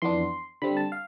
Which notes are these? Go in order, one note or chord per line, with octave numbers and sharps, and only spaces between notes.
F2 E3 B3 D4 C6
D3 G3 C4 B5
A5
F5